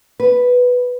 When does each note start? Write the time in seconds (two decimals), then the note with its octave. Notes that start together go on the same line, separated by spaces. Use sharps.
0.20 B4